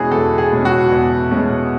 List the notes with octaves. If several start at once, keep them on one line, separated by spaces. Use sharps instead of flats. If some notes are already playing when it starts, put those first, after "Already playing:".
Already playing: E2 B2 G#3 C#4 E4 F#4 G#4
E2 A4
G#4
B2 G#3 C#4
F#4
E2
B2 G#3 C#4